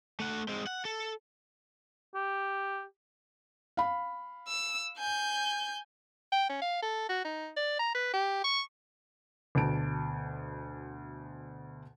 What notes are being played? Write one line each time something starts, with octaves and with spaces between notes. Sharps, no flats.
A3 F#5
G#3 C4
F#5
A4
G4
F5 B5
E6
G#5 G6
G5
C#4
F5
A4
F#4
D#4
D5
A#5
B4
G4
C#6
D2 B2 A5 D7